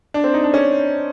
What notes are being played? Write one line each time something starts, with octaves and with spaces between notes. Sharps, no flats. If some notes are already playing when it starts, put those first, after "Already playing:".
D4
C4
D#4
D4
C#4